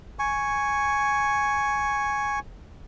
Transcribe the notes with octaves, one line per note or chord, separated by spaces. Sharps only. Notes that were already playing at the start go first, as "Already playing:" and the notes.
G#5 C#6